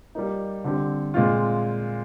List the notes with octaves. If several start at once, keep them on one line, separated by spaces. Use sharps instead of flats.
G3 A#3 D#4
D3 G3 C4
A#2 G#3 C4 F4